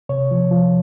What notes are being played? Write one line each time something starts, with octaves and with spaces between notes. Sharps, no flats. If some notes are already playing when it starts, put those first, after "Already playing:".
C3 C#5
F3
F3